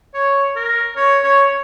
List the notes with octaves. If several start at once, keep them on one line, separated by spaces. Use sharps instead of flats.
C#5
A#4
C#5
C#5